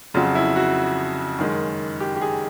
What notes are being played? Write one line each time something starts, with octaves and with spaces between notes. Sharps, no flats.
F2 C#3 F#3 F4
E4
F#4
F#2 D#3 G#3
G4
G4
G#4